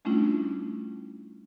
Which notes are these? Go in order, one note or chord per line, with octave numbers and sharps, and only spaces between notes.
G3 A3 C#4 D4 E4 F4